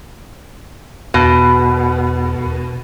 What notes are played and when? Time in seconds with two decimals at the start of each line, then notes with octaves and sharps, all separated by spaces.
1.14 E2 B2